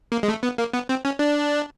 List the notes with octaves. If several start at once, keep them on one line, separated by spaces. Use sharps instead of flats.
A#3
G#3
A3
B3
A#3
B3
C4
C#4
D4